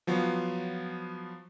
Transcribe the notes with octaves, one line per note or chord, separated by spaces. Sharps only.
F3 F#3 B3 F4